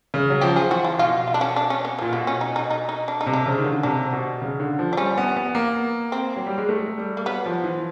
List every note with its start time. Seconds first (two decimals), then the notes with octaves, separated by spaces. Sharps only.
0.14 C#3
0.30 F#3
0.41 F3 G4
0.56 G#4
0.70 E3 F#4
0.84 F4
0.98 B2 F4
1.27 F4
1.34 D4
1.41 C#4
1.56 D4
1.70 C#4
1.85 B3
1.99 F3
2.02 A#2
2.13 B2 B3
2.27 C#4
2.41 D#4
2.56 D#4
2.71 D#4
2.89 D#4
3.08 D4
3.21 D#4
3.26 C3
3.33 D4
3.46 C#3
3.58 D#3
3.64 D3
3.83 C3 D4
4.13 B2
4.42 C#3
4.60 D3
4.79 F3
4.93 D4
4.97 G3 C#4
5.18 B3
5.37 B3
5.55 A#3
6.12 C4
6.36 F#3
6.46 G3
6.58 G#3
6.69 A3
6.98 G3
7.17 A#3
7.26 F#3 B3
7.46 F3
7.64 E3